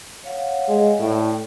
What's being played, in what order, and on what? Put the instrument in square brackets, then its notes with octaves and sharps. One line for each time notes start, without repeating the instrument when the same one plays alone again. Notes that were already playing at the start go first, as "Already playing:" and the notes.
[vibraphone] C#5 F5 F#5
[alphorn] G#3
[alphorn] A2 [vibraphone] D5 E5 G5